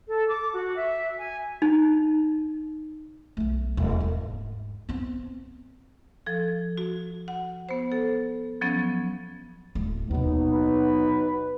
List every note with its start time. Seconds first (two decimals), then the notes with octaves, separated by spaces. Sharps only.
0.08 A4
0.27 D6
0.52 F#4
0.76 E5
1.18 G#5
1.62 D#4
3.37 B1 A3
3.77 D#1
4.00 G#2
4.89 B3 C4
6.26 F3 A4
6.77 F#4
7.28 F#5
7.69 B3 C5
7.92 A4
8.61 F3 F#3 B3 C#4
9.75 D1 A3
10.11 D#2 B2 F#3 B3 D#4
10.52 B4